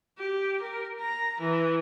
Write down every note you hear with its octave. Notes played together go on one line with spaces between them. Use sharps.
G4
A#4
A#5
E3